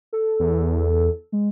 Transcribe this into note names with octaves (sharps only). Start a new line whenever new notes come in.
A4
E2
G#3